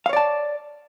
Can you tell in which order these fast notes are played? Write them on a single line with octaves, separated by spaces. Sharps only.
F5 C#5 D5 A5